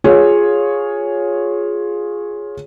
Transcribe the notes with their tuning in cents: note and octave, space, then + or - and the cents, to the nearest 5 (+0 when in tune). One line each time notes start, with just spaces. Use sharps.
F4 +15 G#4 +0 C#5 +0